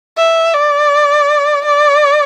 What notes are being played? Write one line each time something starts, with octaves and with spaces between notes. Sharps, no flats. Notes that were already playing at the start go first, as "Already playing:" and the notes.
E5
D5
D5